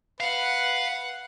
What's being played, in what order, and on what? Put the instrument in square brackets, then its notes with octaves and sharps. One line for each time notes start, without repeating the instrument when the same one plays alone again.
[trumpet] B4 [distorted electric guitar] F5 [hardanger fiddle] F#5